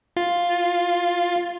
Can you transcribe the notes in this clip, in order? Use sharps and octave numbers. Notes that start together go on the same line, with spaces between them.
F4